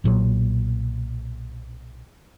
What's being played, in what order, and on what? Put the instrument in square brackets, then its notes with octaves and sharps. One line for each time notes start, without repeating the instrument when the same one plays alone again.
[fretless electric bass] B1 A#2 F#3